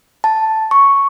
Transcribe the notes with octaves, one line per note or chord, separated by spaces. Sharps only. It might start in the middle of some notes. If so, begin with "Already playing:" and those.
A5
C#6